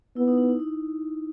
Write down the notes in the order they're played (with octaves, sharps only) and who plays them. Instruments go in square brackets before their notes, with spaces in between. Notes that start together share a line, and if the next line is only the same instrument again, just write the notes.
[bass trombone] B3 [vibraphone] E4
[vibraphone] D#4
D#4
D#4
D#4